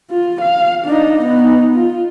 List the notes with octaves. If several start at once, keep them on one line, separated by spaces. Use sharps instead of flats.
F4
F5
D4 D#4
B3 D#4
F4